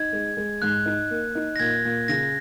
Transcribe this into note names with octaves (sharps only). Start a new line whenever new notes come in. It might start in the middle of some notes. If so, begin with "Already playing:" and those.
Already playing: D#4 G#6
G#3
G#3
G#2 F#6
D#4
A#3
D#4
A#6
A#2 G#6
A#2
C#3 A#6